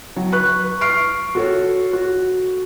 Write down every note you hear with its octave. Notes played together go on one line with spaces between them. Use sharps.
F#3
B4 C#6 F#6
C#6 F6 C7 D7
F#4 A4 C#5
F#4